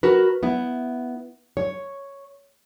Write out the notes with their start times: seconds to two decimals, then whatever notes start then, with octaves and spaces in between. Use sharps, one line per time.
0.03 F#4 A#4 B4
0.43 B3 E4
1.57 C#5